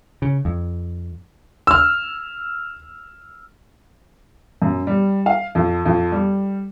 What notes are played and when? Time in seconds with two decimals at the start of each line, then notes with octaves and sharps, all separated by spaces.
0.22 C#3
0.45 F2
1.67 E6 F6
4.62 F#2
4.87 G3
5.26 F5
5.55 F2
5.86 F2
6.12 G3